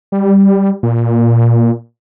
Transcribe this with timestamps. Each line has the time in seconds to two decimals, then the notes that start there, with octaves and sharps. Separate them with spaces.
0.12 G3
0.83 A#2